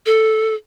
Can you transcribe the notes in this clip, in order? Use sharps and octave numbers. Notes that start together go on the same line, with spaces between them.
A4